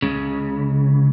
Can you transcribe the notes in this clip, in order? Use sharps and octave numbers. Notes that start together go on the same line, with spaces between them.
C#2 C#3